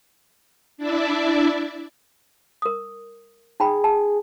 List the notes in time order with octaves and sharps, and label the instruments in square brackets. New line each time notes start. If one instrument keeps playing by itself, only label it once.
[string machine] D4 E4 D5 E5
[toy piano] A#4 D#6
[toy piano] D#4 G5 B5 [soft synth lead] G#4
[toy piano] A5